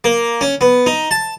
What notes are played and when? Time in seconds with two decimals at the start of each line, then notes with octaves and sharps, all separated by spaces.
0.04 A#3
0.41 C#4
0.61 B3
0.86 D#4
1.11 A5